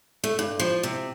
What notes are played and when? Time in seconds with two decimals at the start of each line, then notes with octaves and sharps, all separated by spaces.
0.24 A3
0.39 G2
0.59 F3
0.83 C3